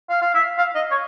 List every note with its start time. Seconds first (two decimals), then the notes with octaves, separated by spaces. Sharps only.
0.10 F5
0.22 F5
0.35 E5
0.58 F5
0.75 D#5
0.91 C#5